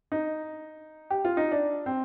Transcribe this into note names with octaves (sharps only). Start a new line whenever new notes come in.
D#4
G4
F4
D#4
D4
C4